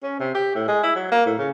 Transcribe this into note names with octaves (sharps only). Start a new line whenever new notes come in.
C#4
C3
G4
A2
G#3
E4
F#3
A#3
A2
C#3